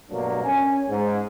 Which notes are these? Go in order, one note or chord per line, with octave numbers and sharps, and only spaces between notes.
G2 B2 F#3 A3 A#3 D4
C#4 G#5
G#2